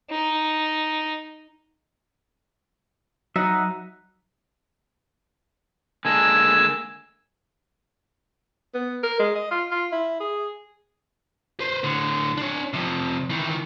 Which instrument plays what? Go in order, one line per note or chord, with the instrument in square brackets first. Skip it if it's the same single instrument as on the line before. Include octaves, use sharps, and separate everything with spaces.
[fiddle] D#4
[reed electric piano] F#3 [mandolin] D#4 [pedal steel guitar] E5 F#5
[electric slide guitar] D3 G#3 A#3 [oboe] G#5 [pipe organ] A5 E6
[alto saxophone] B3
A#4
G#3
D#5
F4
F4
E4
G#4
[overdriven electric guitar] B4 C5
A2 D3
D4 C#5
F2 C3
D#3 E3